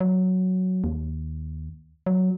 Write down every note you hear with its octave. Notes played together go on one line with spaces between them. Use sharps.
F#3
D#2
F#3